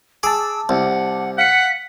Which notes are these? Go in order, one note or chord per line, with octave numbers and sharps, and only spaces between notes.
G#4 A5 D6 E6
C2 F#5
F5 F#5 B6 C#7